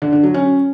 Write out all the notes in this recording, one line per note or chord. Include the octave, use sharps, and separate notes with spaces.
D3
D3
F#3
C#4